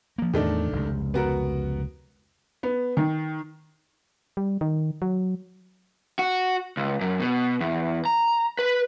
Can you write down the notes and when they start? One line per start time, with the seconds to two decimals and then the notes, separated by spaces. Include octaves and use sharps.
0.18 F3 A#3
0.33 E2 A2 D#3 A3 D4
0.73 F1 C#2
1.14 B3 F#4 A#4
2.63 B3
2.97 D#3
4.37 G3
4.61 D#3
5.02 F#3
6.19 F#4
6.77 C#2
7.01 F#2
7.20 B2
7.60 E2
8.05 A#5
8.59 B4